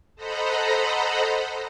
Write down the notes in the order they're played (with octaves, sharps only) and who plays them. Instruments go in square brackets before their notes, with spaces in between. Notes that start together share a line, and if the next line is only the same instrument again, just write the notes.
[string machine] A4 C5 D#5 F#5 A#5 B5